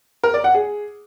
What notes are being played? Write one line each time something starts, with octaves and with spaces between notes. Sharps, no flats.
A#4
D5
F#5
G#4